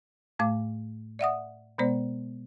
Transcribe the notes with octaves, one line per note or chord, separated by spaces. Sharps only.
A2 A3 F5 D6
D5 E5 F#5 D#6
B2 G#3 B3 C5 D5